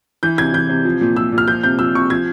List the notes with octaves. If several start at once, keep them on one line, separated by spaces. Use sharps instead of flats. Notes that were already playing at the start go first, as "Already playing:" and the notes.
E3 G6
C3 G#6
E3 G6
C3
F3
A#2
F3 E6
A#2
F6
F3 G6
C3 G6
F3 E6
C3 C#6
F3 G#6